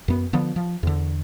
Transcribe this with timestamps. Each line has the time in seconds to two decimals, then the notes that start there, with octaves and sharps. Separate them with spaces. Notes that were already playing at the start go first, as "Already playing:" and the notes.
0.08 F#2 B3
0.33 D3 F3 B3
0.56 F3
0.83 E2 D3